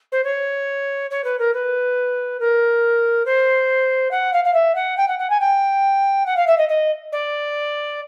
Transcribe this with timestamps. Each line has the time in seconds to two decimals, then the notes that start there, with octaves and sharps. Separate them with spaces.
0.12 C5
0.24 C#5
1.10 C#5
1.24 B4
1.39 A#4
1.53 B4
2.40 A#4
3.25 C5
4.11 F#5
4.33 F5
4.44 F5
4.53 E5
4.75 F#5
4.97 G5
5.08 F#5
5.19 F#5
5.30 G#5
5.40 G5
6.26 F#5
6.36 F5
6.47 E5
6.57 D#5
6.69 D#5
7.12 D5